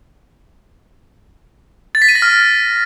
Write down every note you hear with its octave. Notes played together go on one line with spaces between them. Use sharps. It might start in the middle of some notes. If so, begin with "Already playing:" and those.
A6
B6
D#7
A#6
F6